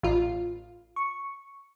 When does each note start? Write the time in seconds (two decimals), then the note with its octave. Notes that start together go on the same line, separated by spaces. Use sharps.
0.03 A1 F4
0.96 C#6